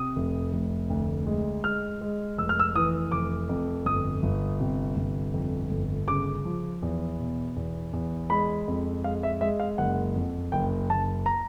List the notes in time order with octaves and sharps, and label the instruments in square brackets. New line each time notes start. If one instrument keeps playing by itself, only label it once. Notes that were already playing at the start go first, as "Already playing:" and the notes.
Already playing: [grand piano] C3 D#6
F1
F1
D2
G#3
G#3 F6
G#3
F1 E6
F6
E6
E3 D#6
F1 D6
F2
G1 D#6
G1
C3
G1
F2
G1
C#3 D6
F3
E2
B2
E2
E2
G#3 B5
F2
G#3 F5
E5
G#3 E5
F5
F#1 F#5
F2
F#1 G5
F#1 A5
A#5